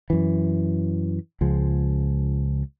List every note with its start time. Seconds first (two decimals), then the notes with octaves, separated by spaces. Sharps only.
0.10 F#2 E3
1.41 C#2 F3 G#3